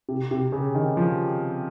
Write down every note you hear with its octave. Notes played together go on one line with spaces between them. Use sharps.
C3
C3
C#3
D#3
F3